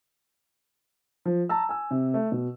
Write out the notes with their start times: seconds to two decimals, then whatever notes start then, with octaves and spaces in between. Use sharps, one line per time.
1.25 F3
1.49 A5 A#5 E6
1.69 G#5 E6
1.91 C3
2.14 A3
2.32 B2